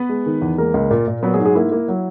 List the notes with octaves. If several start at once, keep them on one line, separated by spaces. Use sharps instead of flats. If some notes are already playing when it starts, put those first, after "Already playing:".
Already playing: B3 B4
G#3
D#3
E2
G#3 A#3 A#4
C#2
A#2
A#2
F#3 B3 B4
G#3 G#4
G#2
G#3 G#4
A#3 E4
A#3
F#3